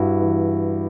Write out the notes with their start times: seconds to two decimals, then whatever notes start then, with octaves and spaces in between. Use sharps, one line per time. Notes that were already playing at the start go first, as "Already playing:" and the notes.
Already playing: G2 E4 F#4
0.21 E3